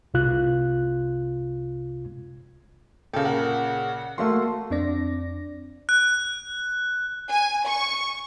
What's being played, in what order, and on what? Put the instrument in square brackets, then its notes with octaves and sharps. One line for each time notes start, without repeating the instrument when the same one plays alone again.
[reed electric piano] C2 C3 F4 F#6
[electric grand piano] A#2 C#3 [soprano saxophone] A4 [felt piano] F5 G5
[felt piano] A#4 [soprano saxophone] F#5
[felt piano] A3 A#3 F#4 [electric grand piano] C6
[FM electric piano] F2 C4 D4 D5 A#6
[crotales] F#6
[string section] G#5
C#6